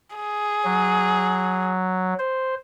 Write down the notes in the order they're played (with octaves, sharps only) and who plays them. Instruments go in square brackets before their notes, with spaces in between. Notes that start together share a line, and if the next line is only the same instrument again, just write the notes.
[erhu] G#4
[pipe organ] F#3
C5